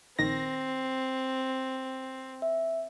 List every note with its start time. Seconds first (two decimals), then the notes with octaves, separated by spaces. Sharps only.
0.19 A#1 D#3 C4 A#6
2.42 E5